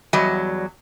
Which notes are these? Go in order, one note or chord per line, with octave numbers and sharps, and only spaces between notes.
E2 F#3 G3 D#5